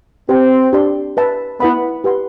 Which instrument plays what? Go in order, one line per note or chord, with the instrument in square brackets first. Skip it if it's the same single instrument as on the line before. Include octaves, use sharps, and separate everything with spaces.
[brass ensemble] C4 [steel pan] G4 C5 G5 C6
[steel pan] D4 G4 D5 A5 C6
B4 E5 A5
[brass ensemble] B3 [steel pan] E4 B4 F#5 B5
[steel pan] G4 B4 F#5 C6